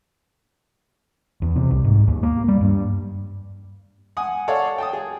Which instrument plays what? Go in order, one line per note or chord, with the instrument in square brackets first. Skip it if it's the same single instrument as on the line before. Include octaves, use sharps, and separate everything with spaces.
[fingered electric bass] E2
C3
C2
G#2
D#2
A#3
G3
G2
[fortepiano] F#5 G#5 D#6
A4 C#5 D5 F5 F#5
G5 A5 D#6
G#4